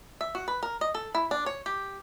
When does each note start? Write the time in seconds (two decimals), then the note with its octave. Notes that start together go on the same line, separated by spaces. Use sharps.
0.21 E5
0.35 F#4
0.48 B4
0.63 A#4
0.81 D#5
0.95 A4
1.15 E4
1.31 D4
1.46 C#5
1.66 G4